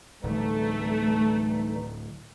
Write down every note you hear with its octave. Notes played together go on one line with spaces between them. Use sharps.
D1 E3 G3 A3 D#4